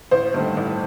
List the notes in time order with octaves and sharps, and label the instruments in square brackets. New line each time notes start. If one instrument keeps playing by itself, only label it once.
[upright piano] A1 C5
G2 D#3 A3
A1